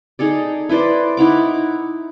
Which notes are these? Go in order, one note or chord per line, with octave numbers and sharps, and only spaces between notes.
D#4 G#4 A4 D5
E4 B4 C5 D5
D#4 E4 F#5 D6